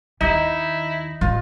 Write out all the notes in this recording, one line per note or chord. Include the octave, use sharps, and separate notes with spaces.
D#2 D#3 D#4 E4
A1 E3 F4